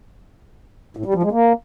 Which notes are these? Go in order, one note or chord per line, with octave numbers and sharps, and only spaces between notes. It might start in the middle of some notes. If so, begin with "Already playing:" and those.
A2
G3
F3
G#3
A#3